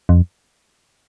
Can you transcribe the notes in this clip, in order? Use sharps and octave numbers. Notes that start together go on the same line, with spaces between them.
F2